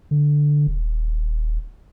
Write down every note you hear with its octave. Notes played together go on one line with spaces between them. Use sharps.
D3
D#1